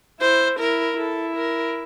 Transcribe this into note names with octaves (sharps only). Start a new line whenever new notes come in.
E4 C5
E4 A#4
E4 A4
A#4